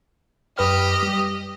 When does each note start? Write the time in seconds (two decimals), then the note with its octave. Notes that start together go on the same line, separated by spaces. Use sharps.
0.58 F#2 G4 B4 D#5 F6
1.03 G3